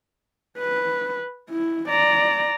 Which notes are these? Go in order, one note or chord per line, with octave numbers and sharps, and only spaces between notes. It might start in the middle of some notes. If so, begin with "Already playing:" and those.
B4
E4
D5 A#5